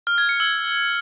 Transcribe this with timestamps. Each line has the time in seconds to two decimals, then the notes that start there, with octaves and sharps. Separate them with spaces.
0.07 F6
0.18 G#6
0.29 C#7
0.40 E6